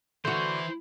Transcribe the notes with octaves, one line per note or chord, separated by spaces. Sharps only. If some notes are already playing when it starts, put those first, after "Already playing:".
D3 E3 E4 F#4 C5